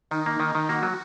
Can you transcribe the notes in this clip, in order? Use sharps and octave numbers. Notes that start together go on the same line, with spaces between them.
D#3 D#4
A#3
D#3
D#3
A#3 F#4
F#3